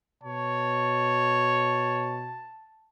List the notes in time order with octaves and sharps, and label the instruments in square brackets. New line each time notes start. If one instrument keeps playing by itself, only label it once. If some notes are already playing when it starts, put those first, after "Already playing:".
[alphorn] B2 [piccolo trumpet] C#5 [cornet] A5